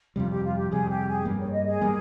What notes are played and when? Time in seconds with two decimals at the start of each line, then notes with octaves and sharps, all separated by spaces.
0.16 F2 C3 G3 F4
0.30 G4
0.44 F4
0.57 G4
0.71 F2 C3 G3 G#4
0.89 G4
1.08 G#4
1.25 G2 G3 A#3
1.39 C#5
1.53 D#5
1.67 G#4
1.82 G3 A#3